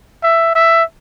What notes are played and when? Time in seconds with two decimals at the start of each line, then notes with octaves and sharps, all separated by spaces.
0.23 E5
0.55 E5